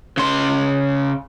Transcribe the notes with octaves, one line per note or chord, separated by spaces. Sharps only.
C#3 C6